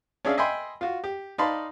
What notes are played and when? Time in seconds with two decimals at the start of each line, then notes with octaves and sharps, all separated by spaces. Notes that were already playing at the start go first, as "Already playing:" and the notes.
0.25 C#4 D4 G#4 D5 E5 F5
0.38 D#5 E5 G5 G#5 B5 C6
0.81 F4 F#4
1.04 G4
1.38 D#4 D5 F5 A5 B5 C6